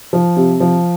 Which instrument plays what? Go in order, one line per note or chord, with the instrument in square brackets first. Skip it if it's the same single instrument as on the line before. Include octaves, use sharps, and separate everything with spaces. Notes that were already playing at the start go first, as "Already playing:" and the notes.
[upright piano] F3
C3
F3